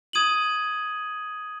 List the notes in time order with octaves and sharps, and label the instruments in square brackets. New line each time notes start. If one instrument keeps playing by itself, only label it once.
[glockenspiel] D#6 G#6 D#7 F#7